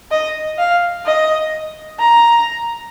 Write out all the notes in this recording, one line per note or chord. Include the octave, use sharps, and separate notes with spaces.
D#5
F5
D#5
A#5